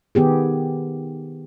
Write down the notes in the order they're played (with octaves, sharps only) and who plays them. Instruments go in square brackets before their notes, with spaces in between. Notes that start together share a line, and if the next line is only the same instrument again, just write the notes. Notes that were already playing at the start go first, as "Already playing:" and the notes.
[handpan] D#3 B3 G4 G#4